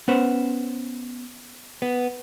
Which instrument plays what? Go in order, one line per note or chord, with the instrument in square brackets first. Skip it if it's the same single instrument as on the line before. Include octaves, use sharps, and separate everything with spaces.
[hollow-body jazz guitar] B3 C#4 B4 C5
B3